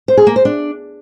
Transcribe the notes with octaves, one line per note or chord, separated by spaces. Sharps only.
C5
G#4
A#3
C5
D4